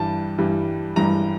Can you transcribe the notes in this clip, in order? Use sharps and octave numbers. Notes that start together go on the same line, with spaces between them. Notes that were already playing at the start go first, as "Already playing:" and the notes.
Already playing: G2 E3 G3 A5
G2 E3 G3
G2 E3 G3 A#5